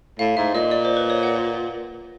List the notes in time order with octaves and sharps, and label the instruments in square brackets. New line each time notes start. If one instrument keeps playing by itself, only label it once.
[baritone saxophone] A2 [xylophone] F5
[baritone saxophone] G#2 [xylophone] E5
[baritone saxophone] A#2 [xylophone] D#5
[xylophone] D5
C5
B4
C#5
F#5